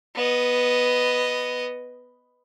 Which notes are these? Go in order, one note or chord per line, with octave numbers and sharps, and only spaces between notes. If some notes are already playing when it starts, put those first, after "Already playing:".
B3 D#5